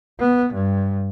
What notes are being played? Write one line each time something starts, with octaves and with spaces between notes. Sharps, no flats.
B3
G2